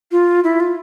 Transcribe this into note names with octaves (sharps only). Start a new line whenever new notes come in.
F4
E4
F4